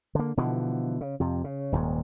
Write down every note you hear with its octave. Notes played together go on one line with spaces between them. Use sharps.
D3 A#3
B2 D3 E3 F3
C#3
F2 C3
C#3
D#1 D#2 G#2